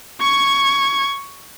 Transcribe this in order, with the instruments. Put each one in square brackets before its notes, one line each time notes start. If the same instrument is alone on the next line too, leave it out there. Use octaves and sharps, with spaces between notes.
[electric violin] C#6 G#6